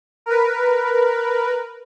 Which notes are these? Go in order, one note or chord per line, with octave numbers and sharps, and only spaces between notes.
A#4 B4